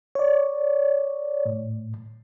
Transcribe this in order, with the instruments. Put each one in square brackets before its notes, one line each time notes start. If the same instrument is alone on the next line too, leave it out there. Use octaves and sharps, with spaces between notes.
[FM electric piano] C#5 D5
[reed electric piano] A2